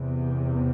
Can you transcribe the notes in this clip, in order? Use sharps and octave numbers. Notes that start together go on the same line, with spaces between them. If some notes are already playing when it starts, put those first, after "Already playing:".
Already playing: E2 C3